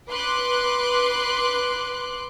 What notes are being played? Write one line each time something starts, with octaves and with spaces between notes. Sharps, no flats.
B4 C6 D6 F#6